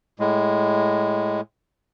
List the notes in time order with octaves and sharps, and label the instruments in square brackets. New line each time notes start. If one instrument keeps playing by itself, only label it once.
[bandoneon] A2 G#3